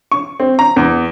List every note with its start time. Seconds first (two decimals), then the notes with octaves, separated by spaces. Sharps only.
0.12 C#6
0.40 C4
0.59 A#5
0.76 E2